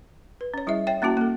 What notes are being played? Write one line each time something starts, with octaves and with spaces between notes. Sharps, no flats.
B4
C#4 C#5
G3 E4 G#4 D#5 E5
C#5 E5 G5
A#3 C#4 E4 F#4 A5
A#3 A4